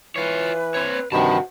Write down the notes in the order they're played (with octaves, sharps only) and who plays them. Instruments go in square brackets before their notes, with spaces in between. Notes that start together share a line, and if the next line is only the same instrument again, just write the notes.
[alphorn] E3 [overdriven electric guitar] F4 C#5 [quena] B4
[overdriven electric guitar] C4 C#5
[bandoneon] G2 C3 D#3 [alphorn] F#4 [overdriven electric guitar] C5 A5 [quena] B5